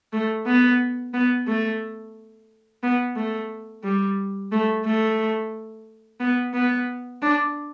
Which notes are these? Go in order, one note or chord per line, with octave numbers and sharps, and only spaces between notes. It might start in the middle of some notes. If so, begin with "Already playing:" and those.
A3
B3
B3
A3
B3
A3
G3
A3
A3
B3
B3
D4